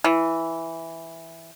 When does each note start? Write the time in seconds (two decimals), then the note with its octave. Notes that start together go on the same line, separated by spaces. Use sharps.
0.04 E3